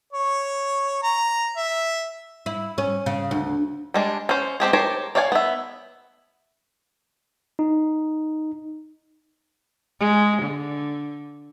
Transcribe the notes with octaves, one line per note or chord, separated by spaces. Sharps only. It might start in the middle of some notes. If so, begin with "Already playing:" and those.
C#5
A#5
E5
E4
C#4
C#3
D2
G3 G#3 D4
C#4 C5
G#3 C4 G4 G#4
G4 A#4 C5 C#5 A5
C#5 D5 F5 F#5 G#5
B3 E5
D#4
G#3
D3